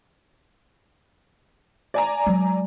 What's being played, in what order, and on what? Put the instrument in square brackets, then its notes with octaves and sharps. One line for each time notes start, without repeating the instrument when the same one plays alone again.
[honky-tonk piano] D5 G#5 A#5
[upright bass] F#3 G#3